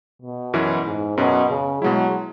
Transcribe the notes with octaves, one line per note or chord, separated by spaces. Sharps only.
B2
F#2 E3 C#4 E4
G#2
F#2 B2 F#3 C#4
C#3
B2 F#3 G#3 E4